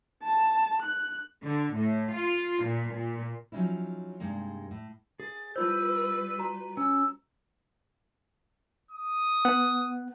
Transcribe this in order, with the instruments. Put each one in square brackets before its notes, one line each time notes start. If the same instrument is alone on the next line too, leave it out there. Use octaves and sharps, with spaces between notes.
[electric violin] A5
F#6
[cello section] D3
A2
F4
A#2
A#2
[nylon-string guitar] F3 F#3 A#3 C#4 D#4 E4
G2 C3 G#3 A#3 D#4
A2
[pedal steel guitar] G#4 [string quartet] A6
[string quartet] G3 B4 [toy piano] E4 F4 C5 [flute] E6 [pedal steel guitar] G6
[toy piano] F#4 A#5
[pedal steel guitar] C#4 [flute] E6
[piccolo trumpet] D#6
[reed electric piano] B3 F#5